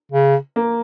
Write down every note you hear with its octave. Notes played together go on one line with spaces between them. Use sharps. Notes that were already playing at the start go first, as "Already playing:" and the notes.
C#3
A#3